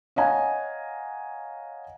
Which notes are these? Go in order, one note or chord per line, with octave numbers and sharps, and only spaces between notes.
C#5 D#5 F5 F#5 G#5 A#5